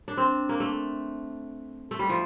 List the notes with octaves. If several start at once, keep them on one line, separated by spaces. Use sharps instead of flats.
D4
C4
A#3
A3
A3
G3
F3